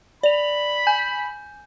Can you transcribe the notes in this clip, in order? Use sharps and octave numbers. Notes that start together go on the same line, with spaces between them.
D5 B5 F7
G#5 G6